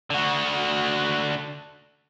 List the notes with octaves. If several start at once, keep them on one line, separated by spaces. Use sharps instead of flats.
D3 F#4